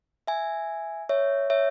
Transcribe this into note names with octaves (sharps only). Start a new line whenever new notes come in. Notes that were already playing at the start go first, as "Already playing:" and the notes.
E5 G#5
C#5 E5
C#5 E5